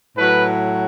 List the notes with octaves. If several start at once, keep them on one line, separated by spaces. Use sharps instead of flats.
A2 F#3 B4